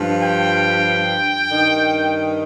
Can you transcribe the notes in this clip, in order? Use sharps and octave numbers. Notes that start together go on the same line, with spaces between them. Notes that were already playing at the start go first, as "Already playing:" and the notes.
Already playing: G2 F3
G5
G2 D#3